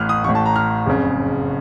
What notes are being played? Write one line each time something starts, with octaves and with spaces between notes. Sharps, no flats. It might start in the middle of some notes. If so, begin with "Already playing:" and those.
Already playing: A1 A2 F6 F#6
D#6
A1 A2 C#6
A5
A#5
F6
F#1 F2 C#3